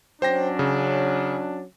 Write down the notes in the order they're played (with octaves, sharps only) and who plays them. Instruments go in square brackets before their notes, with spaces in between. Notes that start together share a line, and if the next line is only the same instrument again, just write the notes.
[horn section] F#3 C#4 D4 [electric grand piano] C5 G5 A#6
[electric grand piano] C#3